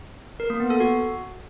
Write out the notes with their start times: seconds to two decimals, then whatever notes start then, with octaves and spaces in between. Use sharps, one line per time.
0.40 A#4
0.50 A#3
0.60 B3
0.70 A4
0.80 F#4